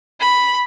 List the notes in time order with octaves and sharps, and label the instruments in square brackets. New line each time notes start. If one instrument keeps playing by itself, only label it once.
[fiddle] B5